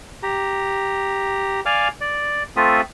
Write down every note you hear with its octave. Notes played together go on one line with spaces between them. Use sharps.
G4 A#5
D5 F5 G#5 D6 F6
D5
A3 C4 F4 A4 E5 D#6